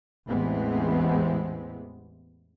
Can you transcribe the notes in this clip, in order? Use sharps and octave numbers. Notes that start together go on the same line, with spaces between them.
A1 E2 E3 G#3 B3 C4